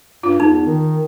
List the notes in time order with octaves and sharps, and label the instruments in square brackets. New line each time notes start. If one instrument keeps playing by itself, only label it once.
[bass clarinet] G2 [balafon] F4
[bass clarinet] E2 [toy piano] D#4
[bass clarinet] D#3